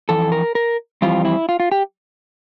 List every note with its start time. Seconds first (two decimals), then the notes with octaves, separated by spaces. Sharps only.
0.09 F2 E3 A4
0.32 A#4
0.55 A#4
1.02 F2 E3 G3 C4 F4
1.25 E4
1.49 F4
1.60 F4
1.72 G4